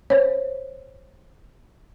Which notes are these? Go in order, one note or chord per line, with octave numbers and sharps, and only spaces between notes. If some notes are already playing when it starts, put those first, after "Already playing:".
C5 C#5